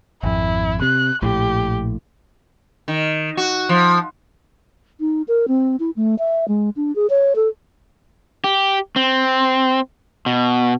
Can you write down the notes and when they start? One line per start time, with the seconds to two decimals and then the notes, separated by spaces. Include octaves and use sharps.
0.23 G#1 F2 E4
0.82 C3 F#6
1.22 A#1 A2 G4
2.88 D#3
3.37 F#4
3.69 F3
5.00 D#4
5.28 A#4
5.48 C4
5.80 E4
5.96 A3
6.19 E5
6.48 G#3
6.76 D4
6.95 G#4
7.10 C#5
7.35 A4
8.44 G4
8.96 C4
10.26 B2